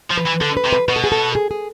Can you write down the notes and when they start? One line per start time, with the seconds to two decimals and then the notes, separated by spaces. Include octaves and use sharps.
0.10 F3
0.18 B4
0.26 E3
0.41 D3 A4
0.57 B4
0.64 C3
0.73 B4
0.88 B2 B4
0.96 A4
1.04 G#4
1.12 A4
1.35 G#4
1.51 G#4